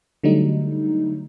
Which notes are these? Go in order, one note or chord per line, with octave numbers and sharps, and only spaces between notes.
D3 F#3 G3 A3 D#4